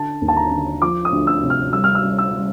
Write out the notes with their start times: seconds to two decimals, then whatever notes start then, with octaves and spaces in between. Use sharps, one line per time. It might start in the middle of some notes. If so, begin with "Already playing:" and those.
Already playing: D3 A5
0.21 D#2
0.28 A5
0.36 A#5
0.51 D3
0.82 F3 D6
1.05 D#6
1.13 D2
1.27 E6
1.42 C3
1.50 F6
1.73 G3 E6
1.84 F6
1.95 E6
2.03 G3
2.18 E6
2.34 G3